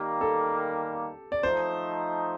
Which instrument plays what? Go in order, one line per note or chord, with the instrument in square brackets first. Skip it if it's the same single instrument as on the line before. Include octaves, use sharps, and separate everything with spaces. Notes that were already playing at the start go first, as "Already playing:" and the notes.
Already playing: [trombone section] D#3 G3 A#3 [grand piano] G4
[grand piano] A4
D5
[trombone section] F3 A3 D#4 [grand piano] C5